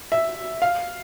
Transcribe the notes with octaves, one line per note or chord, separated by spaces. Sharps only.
E5
F5